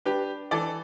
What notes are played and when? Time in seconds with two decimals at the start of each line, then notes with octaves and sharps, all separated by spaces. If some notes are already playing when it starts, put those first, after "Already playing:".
0.05 D4 G4 B4
0.51 E3 A4 D5